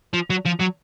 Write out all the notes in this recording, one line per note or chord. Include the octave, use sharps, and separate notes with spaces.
F3
F#3
F3
F#3